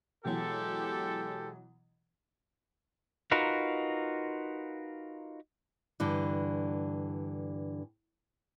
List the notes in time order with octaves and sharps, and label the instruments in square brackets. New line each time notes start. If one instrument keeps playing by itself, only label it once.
[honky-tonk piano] B2 E3 F#3 [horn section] G#3 G4 A4
[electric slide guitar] D#4 F4 F#4 A#4 B4
[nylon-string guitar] G2 D3 E3